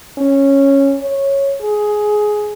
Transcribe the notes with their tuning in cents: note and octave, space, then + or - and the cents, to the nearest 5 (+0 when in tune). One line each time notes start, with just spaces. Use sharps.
C#4 -10
C#5 -10
G#4 +10